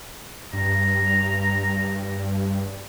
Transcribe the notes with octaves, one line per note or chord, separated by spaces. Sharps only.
G2 A#5